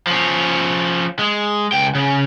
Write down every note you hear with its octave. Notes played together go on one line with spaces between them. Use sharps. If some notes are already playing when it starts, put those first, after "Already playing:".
F3 C#4
G#3
C#2 G5
C#3